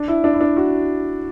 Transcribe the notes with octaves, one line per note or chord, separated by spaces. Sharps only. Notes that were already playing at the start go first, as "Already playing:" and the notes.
Already playing: D4
E4
D4
E4
D4
F#4